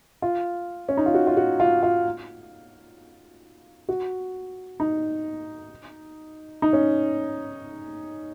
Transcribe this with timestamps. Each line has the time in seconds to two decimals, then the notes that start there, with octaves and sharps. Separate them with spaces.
0.22 F4
0.89 C#4
0.97 D#4
1.06 F4
1.14 F#4
1.27 F4
1.37 F#4
1.60 F4
1.83 F4
3.89 F#4
4.80 D#4
6.62 D#4
6.73 C#4